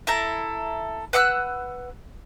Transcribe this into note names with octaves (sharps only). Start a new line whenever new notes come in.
E4 A4 A#5
B4 F#5 E6 F#6